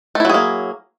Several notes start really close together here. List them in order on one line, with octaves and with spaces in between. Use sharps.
A3 E4 F#3 G#4 A#3